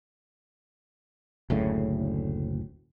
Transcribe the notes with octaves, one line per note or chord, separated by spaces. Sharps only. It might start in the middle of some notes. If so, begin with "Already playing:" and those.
F#1 D2 A2 C#3